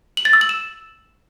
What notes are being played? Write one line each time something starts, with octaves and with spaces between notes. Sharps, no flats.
F#7
A6
E6
F#7
E7